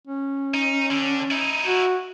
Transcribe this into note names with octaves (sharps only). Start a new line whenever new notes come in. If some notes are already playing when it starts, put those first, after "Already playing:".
C#4
D#4
D3
D#4 E4
F#4